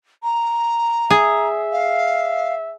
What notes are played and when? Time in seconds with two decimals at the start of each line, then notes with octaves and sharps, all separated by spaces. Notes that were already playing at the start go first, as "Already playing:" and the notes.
0.23 A#5
1.10 G#4 E5
1.72 F5